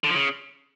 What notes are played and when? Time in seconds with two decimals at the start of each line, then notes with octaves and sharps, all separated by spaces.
0.04 D3
0.09 F3
0.15 C#3